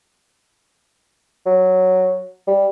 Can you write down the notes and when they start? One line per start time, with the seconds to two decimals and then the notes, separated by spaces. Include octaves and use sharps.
1.46 F#3
2.48 G3